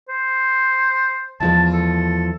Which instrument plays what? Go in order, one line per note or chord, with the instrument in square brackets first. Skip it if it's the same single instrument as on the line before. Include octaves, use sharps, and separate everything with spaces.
[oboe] C5
[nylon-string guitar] E2 F3 G#3 [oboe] A5
[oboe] A4